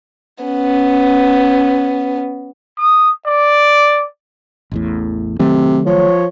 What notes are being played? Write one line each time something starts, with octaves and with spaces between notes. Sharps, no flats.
B3 C#4
D#6
D5
A1 E2 A2
C3 D#3 F#3 A3
F3 C#5